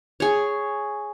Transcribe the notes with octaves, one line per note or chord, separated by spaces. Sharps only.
G#4 C#5